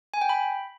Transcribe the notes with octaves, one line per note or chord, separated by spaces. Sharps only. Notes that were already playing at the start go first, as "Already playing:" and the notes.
G#5
G5
B5